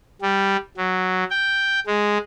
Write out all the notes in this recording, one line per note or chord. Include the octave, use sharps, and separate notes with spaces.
G3
F#3
G5
G#3